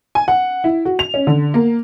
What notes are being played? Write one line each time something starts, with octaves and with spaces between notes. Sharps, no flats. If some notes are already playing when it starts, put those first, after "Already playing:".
G#5
F#5
E4
F#4
F7
C#4
D3
A#3